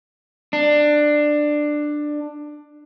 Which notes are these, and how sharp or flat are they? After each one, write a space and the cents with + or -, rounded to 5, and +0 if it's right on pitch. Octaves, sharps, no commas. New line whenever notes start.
D4 +15